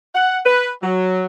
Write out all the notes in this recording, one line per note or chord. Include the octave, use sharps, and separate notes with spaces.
F#5
B4
F#3